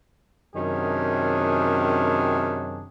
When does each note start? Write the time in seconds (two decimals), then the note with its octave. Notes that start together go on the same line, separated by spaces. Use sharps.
0.56 F#2 C3 D#3 C#4 D4 G#4